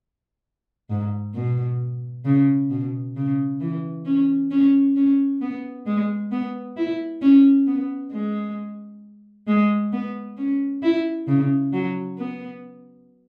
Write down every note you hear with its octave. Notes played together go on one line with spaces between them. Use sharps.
G#2
B2
C#3
B2
C#3
E3
C#4
C#4
C#4
B3
G#3
B3
E4
C#4
B3
G#3
G#3
B3
C#4
E4
C#3
F#3
B3